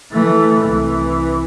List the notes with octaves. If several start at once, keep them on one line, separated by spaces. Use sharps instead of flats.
E3 A3
C2 E3